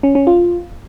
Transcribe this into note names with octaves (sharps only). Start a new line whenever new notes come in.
C#4
C#4
F4